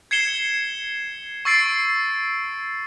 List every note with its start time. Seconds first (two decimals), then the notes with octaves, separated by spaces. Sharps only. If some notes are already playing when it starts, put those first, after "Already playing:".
0.11 G#6 C7 C#7 E7 G7
1.45 C#6 E6 A6 C7 D7